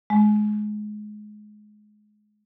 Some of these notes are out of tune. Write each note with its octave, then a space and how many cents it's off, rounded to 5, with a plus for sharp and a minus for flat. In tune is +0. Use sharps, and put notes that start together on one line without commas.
G#3 +20